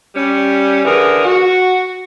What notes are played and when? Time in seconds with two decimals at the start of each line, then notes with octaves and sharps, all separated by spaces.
0.16 G3 C#4
0.85 D3 E3 G#4 A#4
1.24 F#4